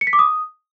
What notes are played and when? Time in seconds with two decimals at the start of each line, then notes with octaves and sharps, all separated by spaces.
0.01 C#7
0.07 B6
0.13 D6
0.19 D#6